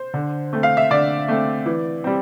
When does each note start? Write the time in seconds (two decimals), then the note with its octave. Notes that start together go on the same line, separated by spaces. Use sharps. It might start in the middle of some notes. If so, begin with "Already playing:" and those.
Already playing: C5
0.14 D3
0.53 A3 C4
0.63 F5
0.77 E5
0.90 D3 D5
1.28 A3 C4
1.66 E3
2.04 G3 C4